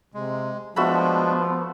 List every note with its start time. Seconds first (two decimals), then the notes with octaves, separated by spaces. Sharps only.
0.14 C3 G#3
0.76 F3 G#3 A3 B3 D4 F#4 B5